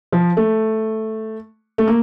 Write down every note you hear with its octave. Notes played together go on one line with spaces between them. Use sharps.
F3
A3
A3
A#3